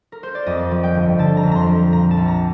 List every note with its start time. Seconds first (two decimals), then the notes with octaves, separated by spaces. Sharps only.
0.12 A#4
0.23 C5
0.35 D5
0.46 F2 D#5
0.71 F3
0.83 G5
0.95 G1
1.19 D3 A5
1.37 A#5
1.43 F2
1.52 A#5 C6
1.68 F3
1.92 A#2 A#5
2.11 A5
2.17 A#1
2.28 A#5